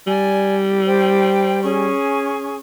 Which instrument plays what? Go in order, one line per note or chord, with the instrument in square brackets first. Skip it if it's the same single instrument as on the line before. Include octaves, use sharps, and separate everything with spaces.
[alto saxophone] G3 [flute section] D5 G#5
[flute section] C5 G5
C#4 G#4 C#6